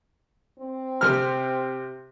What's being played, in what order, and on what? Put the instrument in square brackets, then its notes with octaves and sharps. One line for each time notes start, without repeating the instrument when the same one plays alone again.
[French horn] C4
[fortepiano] C3 F6